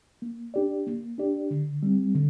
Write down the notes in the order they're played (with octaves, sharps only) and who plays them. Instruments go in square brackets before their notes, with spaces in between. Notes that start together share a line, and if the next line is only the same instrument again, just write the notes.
[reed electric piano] A#3
D4 G4 D5
A#3
D4 G4 D5
D3
G3 C4
D3